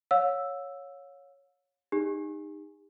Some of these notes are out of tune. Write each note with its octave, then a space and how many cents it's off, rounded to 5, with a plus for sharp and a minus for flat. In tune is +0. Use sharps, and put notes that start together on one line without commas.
C#5 +0 F5 +40 E6 +0
D#4 -15 G4 +45